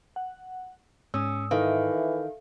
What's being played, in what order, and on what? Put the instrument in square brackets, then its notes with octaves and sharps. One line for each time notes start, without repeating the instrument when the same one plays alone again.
[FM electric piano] F#5
[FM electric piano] G#2 [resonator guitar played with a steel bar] C#4 [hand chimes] D#6 E6
[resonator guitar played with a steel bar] D#3 [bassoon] E3 [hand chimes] A4 E5 F5